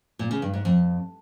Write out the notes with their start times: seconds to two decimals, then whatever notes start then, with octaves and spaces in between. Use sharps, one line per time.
0.19 A#2
0.31 C#3
0.42 G2
0.54 G#2
0.65 F2